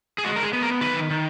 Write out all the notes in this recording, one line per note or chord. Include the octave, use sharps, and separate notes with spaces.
G#4
G#3 F#4
A#4
G#4
B3
A#4
D#3 B4
D#3